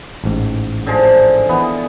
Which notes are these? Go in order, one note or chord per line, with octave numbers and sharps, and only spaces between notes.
A1 G#2
D3 F3 G#3
E3 B3